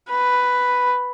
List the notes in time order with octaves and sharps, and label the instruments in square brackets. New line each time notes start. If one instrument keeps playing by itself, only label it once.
[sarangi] B4